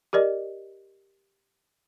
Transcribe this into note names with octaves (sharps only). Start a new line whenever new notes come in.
G4 A#4 D5 D#5